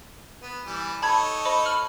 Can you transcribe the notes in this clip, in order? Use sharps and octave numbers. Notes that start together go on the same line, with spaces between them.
B3
E3 G3
D#4 A4 C#5 A5 B5 G#6
C5 D#5 B5
B5 F6 F#7